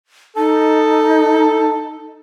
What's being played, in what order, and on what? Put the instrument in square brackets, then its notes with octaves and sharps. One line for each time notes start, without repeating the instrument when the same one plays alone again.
[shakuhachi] D#4 [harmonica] A4